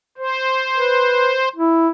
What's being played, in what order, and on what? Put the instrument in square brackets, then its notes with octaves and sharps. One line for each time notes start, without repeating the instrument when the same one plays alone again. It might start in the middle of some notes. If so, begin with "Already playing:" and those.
[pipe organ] C5
[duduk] B4
E4